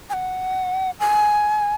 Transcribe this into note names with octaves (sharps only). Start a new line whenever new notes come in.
G#5
F#5
G#5